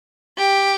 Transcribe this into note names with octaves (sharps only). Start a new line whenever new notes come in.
G4